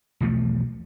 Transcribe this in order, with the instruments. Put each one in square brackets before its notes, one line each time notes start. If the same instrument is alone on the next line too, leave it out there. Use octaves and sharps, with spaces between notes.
[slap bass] B1 E2 F3 A3